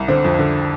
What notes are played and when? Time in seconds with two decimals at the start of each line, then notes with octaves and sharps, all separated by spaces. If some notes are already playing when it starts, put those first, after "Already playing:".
Already playing: C2
0.08 D3 C4
0.24 F2
0.39 D3